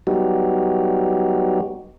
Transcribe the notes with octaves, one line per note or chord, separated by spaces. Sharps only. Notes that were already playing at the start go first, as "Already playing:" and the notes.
F#3 G3 B3 D#4 F#4 G4